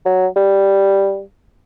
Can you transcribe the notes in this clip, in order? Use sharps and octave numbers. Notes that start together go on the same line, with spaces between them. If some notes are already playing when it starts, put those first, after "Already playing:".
F#3
G3